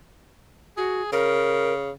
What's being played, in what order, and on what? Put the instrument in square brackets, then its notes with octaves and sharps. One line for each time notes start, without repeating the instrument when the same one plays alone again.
[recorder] F#4 [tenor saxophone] G#4
[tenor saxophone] C#3 [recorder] A#4